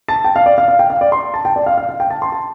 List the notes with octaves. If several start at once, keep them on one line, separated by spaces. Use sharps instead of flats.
A5
G5
F5
D5
F5
F5
G5
F5
D5
C6
A5
G5
D5
F5
F5
F5
G5
A5
C6
A5